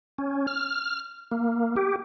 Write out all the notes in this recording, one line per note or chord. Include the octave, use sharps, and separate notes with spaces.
C#4
F6
A#3
G4